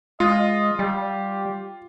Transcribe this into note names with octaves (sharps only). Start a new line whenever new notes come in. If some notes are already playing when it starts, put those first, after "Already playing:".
G#3 F4 D#5
G3 G4